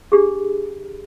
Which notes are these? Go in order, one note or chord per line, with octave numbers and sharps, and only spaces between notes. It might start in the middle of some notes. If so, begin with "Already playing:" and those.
D4 G4 G#4